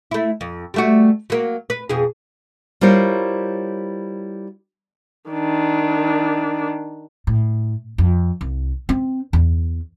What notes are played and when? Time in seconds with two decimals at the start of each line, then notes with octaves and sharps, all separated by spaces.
0.11 A3 E4
0.41 F2
0.74 G3 A3 F#4
1.30 F#3 A#3
1.70 B4
1.89 F2 B2 G#4
2.81 G3 E4 F4 A#4 C5 C#5
5.30 D#3 D4
7.27 A2
7.98 F2
8.41 C2
8.89 C4
9.33 E2